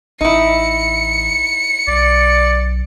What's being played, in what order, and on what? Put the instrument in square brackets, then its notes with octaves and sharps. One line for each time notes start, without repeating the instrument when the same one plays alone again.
[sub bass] A1 [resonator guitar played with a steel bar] D#4 E4 [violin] C#7
[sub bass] B1 [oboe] D5